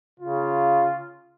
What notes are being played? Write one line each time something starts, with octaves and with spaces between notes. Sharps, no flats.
C#3 F4